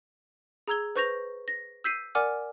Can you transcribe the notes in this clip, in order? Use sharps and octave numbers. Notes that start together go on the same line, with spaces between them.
G#4 A#5 E6 G#6 G7
B4 C5 C#6 G6 A#6 F7
A#6
E6 G6 B6 C7 D#7
A#4 D5 F#5 G#5 D6 F6